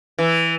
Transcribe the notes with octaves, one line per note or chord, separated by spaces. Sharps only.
E3